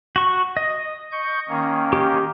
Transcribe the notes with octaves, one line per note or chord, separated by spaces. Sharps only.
F#4 C#6
D#5
C#6 G6
D#3 A#3 C#4
G4